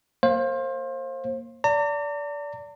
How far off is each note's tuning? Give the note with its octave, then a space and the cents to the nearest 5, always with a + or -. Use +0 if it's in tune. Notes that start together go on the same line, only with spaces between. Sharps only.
A#3 -10 C5 +30 F5 +0
D5 -25 A#5 -45